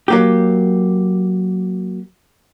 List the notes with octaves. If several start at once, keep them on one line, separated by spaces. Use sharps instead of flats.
F#3 A#3 G4